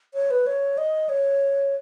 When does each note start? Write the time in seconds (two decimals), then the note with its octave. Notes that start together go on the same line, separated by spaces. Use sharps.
0.14 C#5
0.31 B4
0.46 C#5
0.78 D#5
1.09 C#5